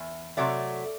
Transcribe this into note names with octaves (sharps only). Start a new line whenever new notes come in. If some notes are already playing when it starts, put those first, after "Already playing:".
Already playing: E2
C3 F#3 A3 D5